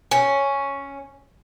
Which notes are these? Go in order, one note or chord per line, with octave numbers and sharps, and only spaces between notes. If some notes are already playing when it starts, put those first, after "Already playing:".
C#4